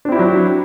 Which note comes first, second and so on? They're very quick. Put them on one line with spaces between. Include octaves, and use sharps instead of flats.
D4 C4 E4 G4 F#3